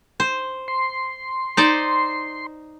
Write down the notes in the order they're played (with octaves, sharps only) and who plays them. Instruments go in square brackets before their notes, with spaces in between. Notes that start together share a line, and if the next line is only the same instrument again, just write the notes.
[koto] C5
[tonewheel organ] C6
[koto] D#4 C5 D5